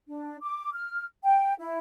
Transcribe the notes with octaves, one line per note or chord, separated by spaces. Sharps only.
D4
D6
F6
G5
E4